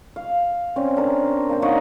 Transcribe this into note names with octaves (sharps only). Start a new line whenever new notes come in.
F5
C4 C#4 D5
D4 A#4
A#3 D5 G5
D#4 C#5 D#5 F#5